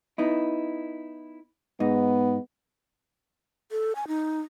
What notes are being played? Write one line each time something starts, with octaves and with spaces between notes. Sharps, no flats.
B3 D#4 E4
G#2 B3 D#4
A4
G#5
D#4